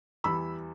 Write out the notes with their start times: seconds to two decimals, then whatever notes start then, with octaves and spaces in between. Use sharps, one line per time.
0.24 E2 E3 G3 B5 E6